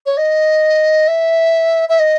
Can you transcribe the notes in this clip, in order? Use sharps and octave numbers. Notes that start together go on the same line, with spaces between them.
C#5
D#5
E5
E5
D#5